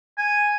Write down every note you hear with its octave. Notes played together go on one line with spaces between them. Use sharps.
G#5